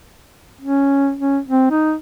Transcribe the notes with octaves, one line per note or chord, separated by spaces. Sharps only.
C#4
C#4
C4
D#4